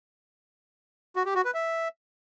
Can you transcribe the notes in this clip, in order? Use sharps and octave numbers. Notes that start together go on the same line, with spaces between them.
F#4
G4
F#4
B4
E5